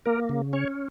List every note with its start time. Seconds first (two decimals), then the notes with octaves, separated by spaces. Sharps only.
0.06 A#3 A#4
0.29 C#3
0.53 C#4 C#5